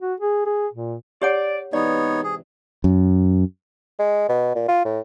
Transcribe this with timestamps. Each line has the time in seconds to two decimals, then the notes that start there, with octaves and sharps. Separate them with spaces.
0.01 F#4
0.20 G#4
0.46 G#4
0.73 A#2
1.22 G4 C#5 D5 F#5
1.73 G#2 C3 E3 B3 D#4 C#5 D5
2.24 G#4
2.84 F#2
3.99 G#3
4.29 B2
4.56 A#2
4.68 F4
4.85 A2